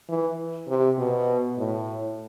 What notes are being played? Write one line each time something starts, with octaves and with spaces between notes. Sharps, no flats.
E3
C3
B2
A2